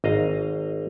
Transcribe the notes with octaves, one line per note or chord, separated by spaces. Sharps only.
G#1 D#5 F5 A#5